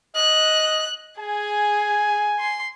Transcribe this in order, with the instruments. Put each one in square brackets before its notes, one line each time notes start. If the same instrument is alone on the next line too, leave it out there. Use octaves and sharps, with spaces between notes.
[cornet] D#5 [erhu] F#6
[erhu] G#4 [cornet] G#5
[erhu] C6